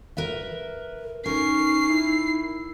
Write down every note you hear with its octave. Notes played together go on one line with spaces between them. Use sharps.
A#4 B4 E5
C#4 D#4 A#4 C7
E4